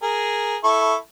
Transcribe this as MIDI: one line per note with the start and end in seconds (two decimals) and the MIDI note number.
0.03 0.56 68
0.03 0.56 70
0.64 0.94 64
0.64 0.94 69
0.64 0.94 85